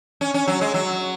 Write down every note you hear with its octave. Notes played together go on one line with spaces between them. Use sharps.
C#4
C#4
F#3
G#3
F#3